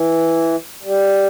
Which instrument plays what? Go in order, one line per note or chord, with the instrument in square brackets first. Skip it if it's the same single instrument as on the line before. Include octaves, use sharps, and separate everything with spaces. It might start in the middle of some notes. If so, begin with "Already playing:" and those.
Already playing: [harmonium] E3
G3